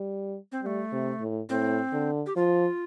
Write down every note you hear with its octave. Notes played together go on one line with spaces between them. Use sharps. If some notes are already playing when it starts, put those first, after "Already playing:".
Already playing: G3
C4
G3 A3 C4
C3
A2
A2 C4
D3
G4
F3 F4